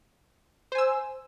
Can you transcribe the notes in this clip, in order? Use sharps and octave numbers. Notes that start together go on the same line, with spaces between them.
C5 G#5 E6